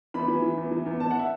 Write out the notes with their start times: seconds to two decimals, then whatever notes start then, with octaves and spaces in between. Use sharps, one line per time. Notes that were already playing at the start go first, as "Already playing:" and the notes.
0.14 E2 B5
0.28 E3
0.42 E3
0.57 E2
0.71 E3
0.86 E2
1.00 E2 A5
1.11 F#5
1.19 E5